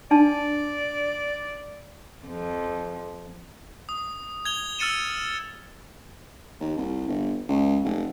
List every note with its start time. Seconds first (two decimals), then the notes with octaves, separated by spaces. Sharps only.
0.11 D4 D5 A5
2.27 F2
3.89 D#6
4.45 G#6 F7 G7
4.79 E6 F6 A6 C#7 D#7 E7
6.61 D#2
6.77 C2
7.08 G1
7.49 C#2
7.84 F1